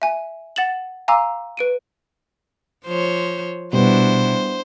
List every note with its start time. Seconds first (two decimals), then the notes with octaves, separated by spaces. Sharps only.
0.02 E5 G#5
0.56 F#5 A6 E7 F#7
1.08 F5 G#5 A#5 C6 D6 E6
1.57 B4 D7 D#7
2.85 F3 C5 C#5
3.73 B2 G3 B3 D4 E4 F#4 C5